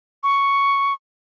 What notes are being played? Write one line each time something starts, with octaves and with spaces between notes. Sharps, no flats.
C#6